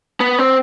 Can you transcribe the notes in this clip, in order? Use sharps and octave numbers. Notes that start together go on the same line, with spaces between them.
B3
C4